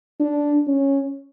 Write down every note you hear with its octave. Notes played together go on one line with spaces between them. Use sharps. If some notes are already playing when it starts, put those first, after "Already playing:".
D4
C#4